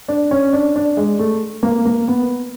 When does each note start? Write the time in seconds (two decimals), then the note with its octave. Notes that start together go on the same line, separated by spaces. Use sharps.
0.08 D4
0.31 C#4
0.53 D4
0.76 D4
0.97 G#3
1.19 A3
1.63 A#3
1.85 A#3
2.08 B3